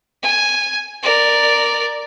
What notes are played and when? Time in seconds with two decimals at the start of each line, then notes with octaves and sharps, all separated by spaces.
0.23 G#5
1.03 A#4 D5